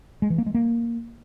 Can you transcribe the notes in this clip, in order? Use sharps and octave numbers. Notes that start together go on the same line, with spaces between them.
G#3
E3
A#3
G#3
A#3